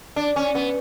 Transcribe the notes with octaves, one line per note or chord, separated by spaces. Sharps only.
D4
C#4
B3